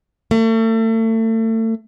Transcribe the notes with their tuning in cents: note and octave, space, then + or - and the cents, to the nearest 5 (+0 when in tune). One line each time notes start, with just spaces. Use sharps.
A3 +35